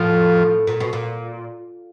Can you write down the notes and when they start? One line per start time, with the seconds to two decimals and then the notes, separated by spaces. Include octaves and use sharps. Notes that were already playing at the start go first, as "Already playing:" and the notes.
Already playing: A2 F3
0.67 A#2
0.80 B2
0.93 A#2